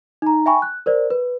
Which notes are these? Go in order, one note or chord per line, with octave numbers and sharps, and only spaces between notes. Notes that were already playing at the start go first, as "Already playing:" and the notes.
D#4 A#5
E5 G5 G#5 B5 C#6
F#6
A#4 C5 D5
B4